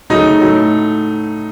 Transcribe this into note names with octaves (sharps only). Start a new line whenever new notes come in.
C#3 F#3 A3 D#4
A2 F#3 A3